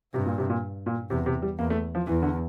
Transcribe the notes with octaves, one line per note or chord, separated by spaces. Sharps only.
G2 C3
A#2
C3
A#2
A#2
E2 C3
C3
G3
E2 A#3
A3
F3
E2 E3
D3